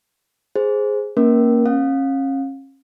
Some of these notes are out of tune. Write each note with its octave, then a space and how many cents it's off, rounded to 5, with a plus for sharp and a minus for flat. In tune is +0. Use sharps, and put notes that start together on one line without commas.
G#4 +0 C5 +0
A#3 +0 C#4 +0 A#4 +30
C#4 -35 F5 +30